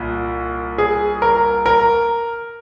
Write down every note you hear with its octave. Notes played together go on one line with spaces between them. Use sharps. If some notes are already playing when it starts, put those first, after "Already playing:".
Already playing: C2 A#2
G#4
A#4
A#4